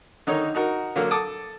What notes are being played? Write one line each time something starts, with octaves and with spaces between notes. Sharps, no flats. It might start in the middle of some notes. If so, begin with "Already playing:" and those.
D3 D#3 D#4 C#5
D#4 F#4 A#4
D3 F#3 A#3
A4 D6 D#6